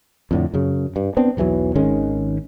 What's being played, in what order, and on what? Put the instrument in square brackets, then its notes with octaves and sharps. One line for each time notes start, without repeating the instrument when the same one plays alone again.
[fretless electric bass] F2 A2 D3
F#2 C#3
G2
B3 C4 D4
B1 E2 E3 F#3
G#1 D#3 G#3 C#4